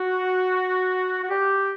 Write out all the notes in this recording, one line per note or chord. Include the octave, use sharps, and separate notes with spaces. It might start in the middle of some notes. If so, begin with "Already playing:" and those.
Already playing: F#4
F#4
G4